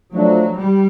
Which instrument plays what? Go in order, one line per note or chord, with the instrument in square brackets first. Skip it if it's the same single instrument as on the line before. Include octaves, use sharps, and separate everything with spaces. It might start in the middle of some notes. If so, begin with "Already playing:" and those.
[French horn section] F3 A3 D4 [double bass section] F#3
[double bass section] G3